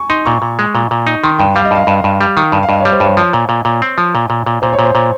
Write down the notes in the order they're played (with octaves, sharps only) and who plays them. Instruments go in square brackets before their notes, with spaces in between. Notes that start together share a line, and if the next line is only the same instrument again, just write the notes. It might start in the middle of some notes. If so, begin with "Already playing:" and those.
Already playing: [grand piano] G#5 C#6
[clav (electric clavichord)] D#4 [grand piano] C6
[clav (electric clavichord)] A#2 [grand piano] C#6
[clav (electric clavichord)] A#2
G#3
A#2
A#2
D#4
[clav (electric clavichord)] D#3 [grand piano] C6
[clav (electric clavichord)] G2 [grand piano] G5
[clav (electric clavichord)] G3 [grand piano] F5
[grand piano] D#5
[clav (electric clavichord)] G2 [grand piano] F5
[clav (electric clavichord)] G2
G2
G3
D#3
G2
[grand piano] F5
[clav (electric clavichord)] G2 [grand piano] D#5
[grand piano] C#5
[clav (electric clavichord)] G3
[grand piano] C5
[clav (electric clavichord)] G2 [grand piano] C#5
[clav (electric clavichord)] F3
A#2
A#2
A#2
C4
F3
A#2
A#2
A#2
[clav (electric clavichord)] A#2 [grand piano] C5
[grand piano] C#5
[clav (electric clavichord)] A#2
[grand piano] C5
[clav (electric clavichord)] A#2